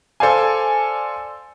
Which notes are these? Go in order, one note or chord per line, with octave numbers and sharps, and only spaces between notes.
A4 C5 D5 F5 G#5